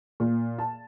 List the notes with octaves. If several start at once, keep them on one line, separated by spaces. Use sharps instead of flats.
A#2
A5